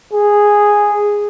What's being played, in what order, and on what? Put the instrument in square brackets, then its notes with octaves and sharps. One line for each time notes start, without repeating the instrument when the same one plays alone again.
[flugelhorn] G#4